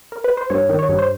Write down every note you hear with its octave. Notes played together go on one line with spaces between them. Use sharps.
A#4
B4
C5
G2 C#5
D#3
C#5
G2
C5